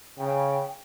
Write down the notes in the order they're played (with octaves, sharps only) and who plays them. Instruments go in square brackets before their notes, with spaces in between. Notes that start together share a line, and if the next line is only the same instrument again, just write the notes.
[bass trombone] C#3 [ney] G5